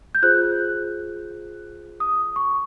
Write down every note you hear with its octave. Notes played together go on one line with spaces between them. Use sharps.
G6
F4 G#4 C5 F#6
D#6
C#6